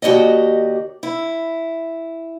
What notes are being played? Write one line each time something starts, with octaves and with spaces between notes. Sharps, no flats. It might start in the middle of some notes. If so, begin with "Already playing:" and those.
D#2 F#4 G4 D5 D#5
E4